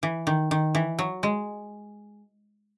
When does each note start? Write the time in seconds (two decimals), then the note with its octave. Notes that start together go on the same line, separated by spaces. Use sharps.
0.03 E3
0.27 D#3
0.51 D#3
0.75 E3
0.99 F#3
1.23 G#3